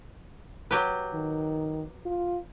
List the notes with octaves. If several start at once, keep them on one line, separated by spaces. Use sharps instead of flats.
F#3 G4 B4
D#3
F4